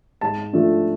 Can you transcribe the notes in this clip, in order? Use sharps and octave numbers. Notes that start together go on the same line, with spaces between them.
G#2 A5
F3 A3 D4 F4